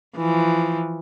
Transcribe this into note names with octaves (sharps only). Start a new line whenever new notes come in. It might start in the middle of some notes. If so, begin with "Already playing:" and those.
E3 F3